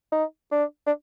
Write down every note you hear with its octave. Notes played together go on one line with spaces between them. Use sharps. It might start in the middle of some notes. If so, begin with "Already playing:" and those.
D#4
D4
D4